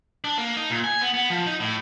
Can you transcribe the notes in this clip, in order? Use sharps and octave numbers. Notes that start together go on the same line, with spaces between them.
D4
A#3
D#4
A#2
G#5
B3
B3
F3
D#4
A2